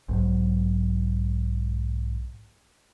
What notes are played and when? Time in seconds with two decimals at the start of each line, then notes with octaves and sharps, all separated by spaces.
0.09 B1 G#2 F#3